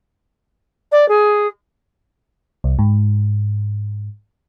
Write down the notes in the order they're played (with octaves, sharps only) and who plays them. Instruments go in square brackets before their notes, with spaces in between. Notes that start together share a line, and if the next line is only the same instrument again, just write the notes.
[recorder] D5
G#4
[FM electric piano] C2
G#2